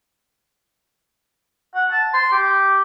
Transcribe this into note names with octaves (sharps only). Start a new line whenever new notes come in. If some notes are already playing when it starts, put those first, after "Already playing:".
F#5
A5
C6
G4